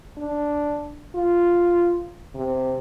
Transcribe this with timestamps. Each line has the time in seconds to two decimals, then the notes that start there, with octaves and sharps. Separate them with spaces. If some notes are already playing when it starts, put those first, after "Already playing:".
0.18 D4
1.15 F4
2.35 C3